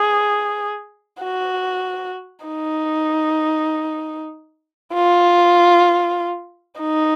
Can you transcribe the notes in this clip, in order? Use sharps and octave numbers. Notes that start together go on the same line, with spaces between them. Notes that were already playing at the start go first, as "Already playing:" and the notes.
Already playing: G#4
F#4
D#4
F4
D#4